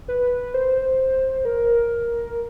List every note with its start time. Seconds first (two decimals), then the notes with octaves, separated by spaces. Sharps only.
0.08 B4
0.54 C5
1.45 A#4